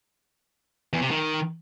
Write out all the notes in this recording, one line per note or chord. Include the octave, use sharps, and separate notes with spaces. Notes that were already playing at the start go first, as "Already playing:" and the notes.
E2
C3
D#3